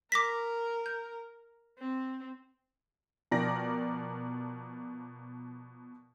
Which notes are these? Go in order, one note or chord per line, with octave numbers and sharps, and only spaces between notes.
A#4 D6 A#6 B6
G6
C4
B2 F3 A#4 D5 G5 A#6